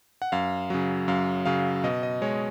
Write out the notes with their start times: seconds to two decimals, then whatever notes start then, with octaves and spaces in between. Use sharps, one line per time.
0.22 F#5
0.32 F#2 F5
0.70 C#3 F#3
1.08 F#2 F5
1.45 C#3 F#3 F5
1.84 B2 D#5
2.03 D#5
2.22 G#3 C#5